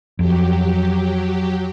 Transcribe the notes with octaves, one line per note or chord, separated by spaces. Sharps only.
F2 F#3 G4